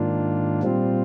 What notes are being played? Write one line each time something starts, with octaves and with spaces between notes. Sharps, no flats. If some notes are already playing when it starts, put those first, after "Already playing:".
Already playing: G#2 D#3 A#3 D4 F4
A#2 G3 C4 F4